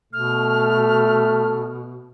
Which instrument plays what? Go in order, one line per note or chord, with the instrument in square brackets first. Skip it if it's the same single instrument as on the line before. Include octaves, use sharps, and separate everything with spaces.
[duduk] B2 [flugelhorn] A3 [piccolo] F6